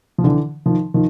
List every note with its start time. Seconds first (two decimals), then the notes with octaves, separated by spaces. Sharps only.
0.18 F3
0.24 D3 E3
0.66 D#3 F3
0.94 D#3 F3